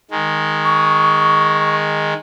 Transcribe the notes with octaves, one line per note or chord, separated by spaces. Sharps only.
D#3 G#3
C#6